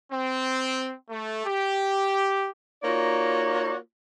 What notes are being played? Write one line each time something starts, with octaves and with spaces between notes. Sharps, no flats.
C4
A3
G4
A#3 D#4 F4 F#4 C#5 D5